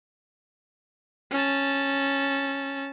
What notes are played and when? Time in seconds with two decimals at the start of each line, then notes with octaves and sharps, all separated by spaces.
1.31 C#4 A5